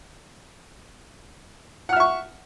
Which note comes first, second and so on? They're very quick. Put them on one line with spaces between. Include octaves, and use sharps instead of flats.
F#5 F6 E5 C#6